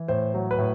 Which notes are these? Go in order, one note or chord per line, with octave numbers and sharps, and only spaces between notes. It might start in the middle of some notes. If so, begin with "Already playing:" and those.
Already playing: E3
A2 C5
F#3
B4
A2